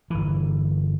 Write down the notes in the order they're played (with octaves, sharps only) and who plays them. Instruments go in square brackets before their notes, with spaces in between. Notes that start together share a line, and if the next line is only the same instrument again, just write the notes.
[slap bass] G1 E3